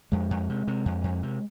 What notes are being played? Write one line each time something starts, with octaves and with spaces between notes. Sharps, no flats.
F2 G#3
F2
C3
C3
F2
F2
C3